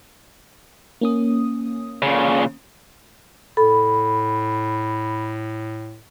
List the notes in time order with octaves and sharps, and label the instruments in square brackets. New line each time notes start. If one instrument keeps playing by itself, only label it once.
[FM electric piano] A#3 C#4 D#6
[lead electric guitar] A#2 C#3
[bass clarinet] A2 [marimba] A4 [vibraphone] B5